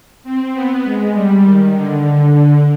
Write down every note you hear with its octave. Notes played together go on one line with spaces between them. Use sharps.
C4
B3
G#3
G3
D#3
D3
D3
D3